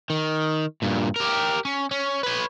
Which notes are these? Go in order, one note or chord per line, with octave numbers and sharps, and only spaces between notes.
D#3
G2 A#2
G4 A#4
C#4
C#4
B4 C#5